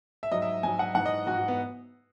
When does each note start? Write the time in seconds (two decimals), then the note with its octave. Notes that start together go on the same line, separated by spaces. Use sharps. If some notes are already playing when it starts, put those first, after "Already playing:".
0.23 E5
0.31 G#2 F#3 D#5
0.42 E5
0.63 G#2 F#3 G#5
0.79 F#5
0.95 G#2 E3 F#5
1.06 D#5
1.27 G#2 E3 F#4
1.37 F#4
1.48 B3